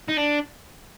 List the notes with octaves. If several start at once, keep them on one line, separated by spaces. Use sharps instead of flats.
D#4
D4